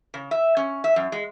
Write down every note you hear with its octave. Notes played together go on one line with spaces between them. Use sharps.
C#3
E5
C#4
E5
F#2
G#3